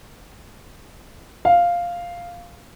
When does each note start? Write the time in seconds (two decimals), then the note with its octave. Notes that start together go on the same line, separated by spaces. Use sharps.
1.45 F5